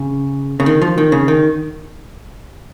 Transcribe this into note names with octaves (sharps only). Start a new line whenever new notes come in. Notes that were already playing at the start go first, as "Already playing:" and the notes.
Already playing: C#3
C#3
D#3
F3
D#3
C#3
D#3